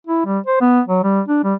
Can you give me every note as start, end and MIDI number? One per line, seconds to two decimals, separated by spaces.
0.07 0.23 64
0.26 0.39 55
0.47 0.59 72
0.61 0.80 59
0.88 1.03 54
1.03 1.21 55
1.28 1.41 62
1.44 1.54 55